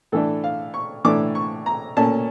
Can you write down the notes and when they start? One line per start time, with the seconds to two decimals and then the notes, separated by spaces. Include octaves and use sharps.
0.12 A2 E3 A3 D4 A4
0.44 F5
0.74 C#6
1.04 A2 E3 A3 D4 D6
1.35 C#6
1.66 A#5
1.97 A#2 A3 C#4 A5